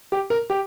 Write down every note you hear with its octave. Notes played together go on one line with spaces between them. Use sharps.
G4
A#4
G4